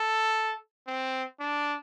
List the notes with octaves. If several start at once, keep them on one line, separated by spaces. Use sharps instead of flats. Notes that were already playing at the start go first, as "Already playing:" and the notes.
Already playing: A4
C4
D4